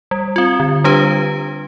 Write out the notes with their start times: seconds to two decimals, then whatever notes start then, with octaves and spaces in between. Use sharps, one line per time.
0.11 G3
0.36 C4 F4
0.60 D3
0.84 G3 D4 G4 B4